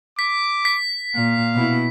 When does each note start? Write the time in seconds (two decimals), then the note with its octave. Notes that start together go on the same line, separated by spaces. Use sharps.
0.19 D6 B6
0.65 B6
1.15 A#2 F5
1.55 B2 E4